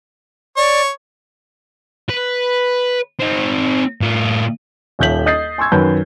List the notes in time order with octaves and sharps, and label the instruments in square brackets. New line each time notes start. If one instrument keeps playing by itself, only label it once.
[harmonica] C#5 [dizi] D5
[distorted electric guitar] B4
C4 D#4
A2 F4
[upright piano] D#1 D#2 E5 G6 B6 F#7
D#5 D#6 G6 A6 C7
G#5 C6 C#6 E6 G#6
F#2 D#3 B4 G6